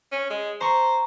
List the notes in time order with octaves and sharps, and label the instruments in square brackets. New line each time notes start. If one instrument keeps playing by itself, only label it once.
[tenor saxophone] C#4
G#3
[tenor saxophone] C5 [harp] A#5 C#6